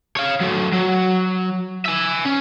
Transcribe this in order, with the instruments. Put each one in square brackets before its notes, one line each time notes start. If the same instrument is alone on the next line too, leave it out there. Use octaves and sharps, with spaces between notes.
[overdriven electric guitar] C#5 F5
F#3 A3
F#3
E5 G#5
C#4